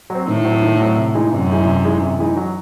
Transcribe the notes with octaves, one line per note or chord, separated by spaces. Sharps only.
F#3 C4
A2 D#3
F#3 C4
D#3
F#3 C4
C3
E3 G#3 D#4
F#2 C3
E3 G#3 D#4
C3
E3 G#3 D#4
C3
E3 G#3 D#4
F#3